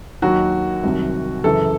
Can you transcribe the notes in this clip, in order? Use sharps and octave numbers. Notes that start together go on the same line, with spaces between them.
D#2 D#3 F#3 F#4
C2 C3 D#3 F#3
F#2 C#3 E3 A4